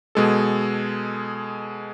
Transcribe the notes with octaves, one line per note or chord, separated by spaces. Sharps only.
B2 G#3 A4